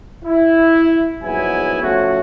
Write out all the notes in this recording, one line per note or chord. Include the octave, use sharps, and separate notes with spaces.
E4
A#1 G#2 F#3 B3 E4 G#5
F3 A3 C#4 F#4